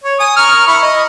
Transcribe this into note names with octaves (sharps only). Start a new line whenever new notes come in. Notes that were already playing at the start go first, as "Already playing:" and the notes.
C#5
G#5 D#6
A#4 C#6 F6
E4 B5 C#6
D#5